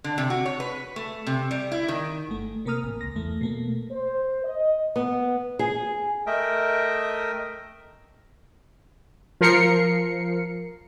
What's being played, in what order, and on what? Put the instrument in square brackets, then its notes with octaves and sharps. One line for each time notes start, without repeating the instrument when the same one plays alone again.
[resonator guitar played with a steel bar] D3
C3
F#4
C#5
B4
A3
C3
G3
E4
D#3
[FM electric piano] G1 A3
C3 A#3 A#4 A#5 D#6 F6
A1
C#2 A#6
E2 A3
B2 A3 A#3
[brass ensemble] C5
D#5
[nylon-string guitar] B3
G#4
[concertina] A3 A#4 D#5 E5 G5
[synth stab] F3 A#4 C7 C#7